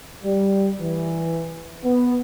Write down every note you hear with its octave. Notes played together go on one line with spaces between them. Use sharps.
G3
E3
B3